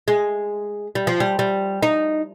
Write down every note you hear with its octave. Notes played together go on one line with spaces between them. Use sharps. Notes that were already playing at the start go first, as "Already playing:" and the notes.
G#3
G3
F3
G3
G3
D#4